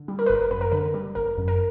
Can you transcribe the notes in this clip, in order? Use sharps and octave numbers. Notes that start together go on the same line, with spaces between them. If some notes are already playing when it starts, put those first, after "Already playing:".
Already playing: D3
G3
A#4
B4
G1 A#4
F#2 B4
A#4
D3 B4
G3
G1 A#4
F#2
A#4